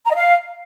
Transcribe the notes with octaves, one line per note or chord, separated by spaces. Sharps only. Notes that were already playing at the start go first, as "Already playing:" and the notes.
A#5
D#5
F5